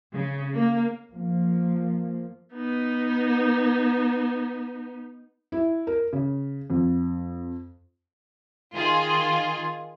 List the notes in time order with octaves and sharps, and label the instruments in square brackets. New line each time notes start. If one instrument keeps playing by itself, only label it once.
[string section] C#3
A#3
[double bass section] F3 A#3
[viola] B3 D#4
[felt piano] E4
A#4
C#3
F2
[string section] D#3 F4 G#4